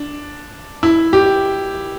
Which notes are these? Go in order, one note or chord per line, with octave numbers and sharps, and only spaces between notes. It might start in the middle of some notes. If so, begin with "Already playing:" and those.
Already playing: D4
E4
G4